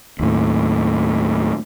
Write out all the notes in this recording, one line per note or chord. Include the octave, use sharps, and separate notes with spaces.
D#2 A2